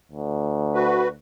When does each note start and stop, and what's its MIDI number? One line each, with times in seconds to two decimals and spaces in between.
0.12 1.17 38
0.74 1.08 66
0.74 1.08 71